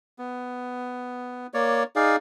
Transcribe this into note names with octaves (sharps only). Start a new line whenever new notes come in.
B3
A#3 C#5 D5
D#4 G#4 D5 F5